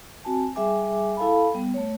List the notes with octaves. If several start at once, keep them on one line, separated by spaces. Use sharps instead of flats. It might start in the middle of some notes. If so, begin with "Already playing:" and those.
C4 F#4 G#5 A5
G3 G#4 E5 G#5 D6
E4 A4 F5 A5 B5
G3 B3
A3 C#5